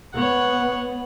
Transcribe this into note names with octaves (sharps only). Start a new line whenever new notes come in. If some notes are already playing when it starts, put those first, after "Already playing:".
B3 C#5 F#5